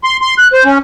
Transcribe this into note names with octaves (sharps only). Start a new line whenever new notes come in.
C6
C6
F#6
C5
C#4